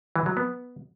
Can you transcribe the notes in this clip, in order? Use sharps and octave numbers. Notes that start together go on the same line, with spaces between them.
E3
F#3
B3